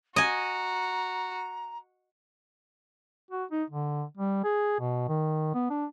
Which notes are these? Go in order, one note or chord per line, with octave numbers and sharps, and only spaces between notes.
F#4 D#5 G#5 A#5
F#4
D#4
D3
G3
G#4
B2
D#3
B3
D4